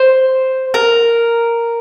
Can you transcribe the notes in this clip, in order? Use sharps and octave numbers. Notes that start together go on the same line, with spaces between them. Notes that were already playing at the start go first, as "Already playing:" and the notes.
Already playing: C5
A#4